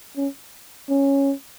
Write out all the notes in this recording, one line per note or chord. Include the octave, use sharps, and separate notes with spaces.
C#4
C#4